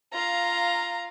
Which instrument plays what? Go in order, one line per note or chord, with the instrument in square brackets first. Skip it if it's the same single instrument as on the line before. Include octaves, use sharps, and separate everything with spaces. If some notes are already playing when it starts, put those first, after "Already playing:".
[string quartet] F4 F5 [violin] A#5